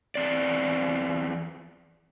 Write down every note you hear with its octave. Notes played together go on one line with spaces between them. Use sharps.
E2 C4 D5